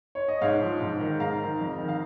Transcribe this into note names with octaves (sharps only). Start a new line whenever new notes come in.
C#5
D#5
G#2 C#5 F5
F3
G#2
D#3
G#2 F5 A#5
D#3
F2
D#3
F5